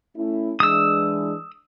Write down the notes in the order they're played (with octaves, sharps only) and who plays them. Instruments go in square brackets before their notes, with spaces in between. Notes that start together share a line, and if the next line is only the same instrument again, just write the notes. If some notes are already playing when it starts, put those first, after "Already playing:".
[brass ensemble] A3 C#4 E4
[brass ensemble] E3 G#3 D4 [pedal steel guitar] D#6 E6